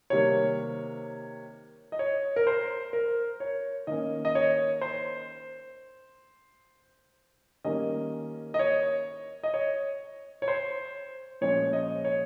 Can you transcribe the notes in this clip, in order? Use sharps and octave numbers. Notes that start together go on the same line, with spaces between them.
C3 D#3 G3 A#3 C#5
D#5
C#5
A#4
C5
A#4
C#5
D#3 A#3 C#4 D#5
D#5
C#5
C5
D#3 G3 A#3 C#4 D#5
D#5
C#5
D#5
C#5
C#5
C5
A#2 F3 G#3 C#4 C#5
D#5
C#5